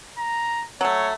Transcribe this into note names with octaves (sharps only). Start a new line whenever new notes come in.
A#5
F#3 A3 C#5